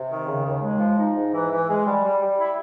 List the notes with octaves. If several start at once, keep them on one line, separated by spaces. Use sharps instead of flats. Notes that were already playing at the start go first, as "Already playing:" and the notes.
Already playing: C3
D#3
C#3
D#2
G#3
F3
D#4
G#2
E3
E3
G#3
G3
G3
G3
E4